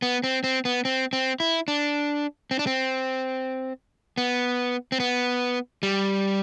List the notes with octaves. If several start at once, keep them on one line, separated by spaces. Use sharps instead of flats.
B3
C4
C4
B3
C4
C4
E4
D4
C4
D4
C4
B3
C4
B3
G3